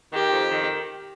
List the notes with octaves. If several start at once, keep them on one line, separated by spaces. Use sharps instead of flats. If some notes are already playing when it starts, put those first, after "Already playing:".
D#3 G4
F2
D#3